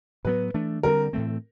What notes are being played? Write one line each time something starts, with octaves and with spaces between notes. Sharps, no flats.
A2 F#3 B3 B4
E3 A3 D4
D3 G3 C4 A#4
A2 E3 A3 C4